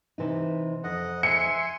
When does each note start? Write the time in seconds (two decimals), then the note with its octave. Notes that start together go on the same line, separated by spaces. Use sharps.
0.18 C3 E3 D#4
0.84 F2 D#5 F#5
1.23 E5 G#5 C6 C#7